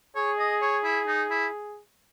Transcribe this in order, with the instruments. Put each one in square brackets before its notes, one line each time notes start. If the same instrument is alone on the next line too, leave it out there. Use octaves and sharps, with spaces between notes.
[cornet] G#4 [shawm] C#5
[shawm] D#5
C#5
E4
D#4
E4